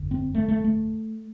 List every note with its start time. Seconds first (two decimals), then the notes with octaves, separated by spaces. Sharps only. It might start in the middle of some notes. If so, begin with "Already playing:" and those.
Already playing: G1 F2 D3
0.11 C4
0.34 A3
0.48 A3
0.65 A3